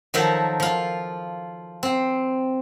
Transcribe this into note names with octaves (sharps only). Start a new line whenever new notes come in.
D#3 F3 F#3 A4
F3 F4
C4